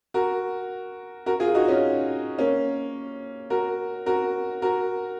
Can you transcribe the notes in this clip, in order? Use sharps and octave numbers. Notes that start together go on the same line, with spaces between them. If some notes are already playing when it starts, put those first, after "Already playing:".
F#4 A#4
F#4 A#4
F4 G#4
D#4 F#4
C#4 F4
A#3 C#4
F#4 A#4
F#4 A#4
F#4 A#4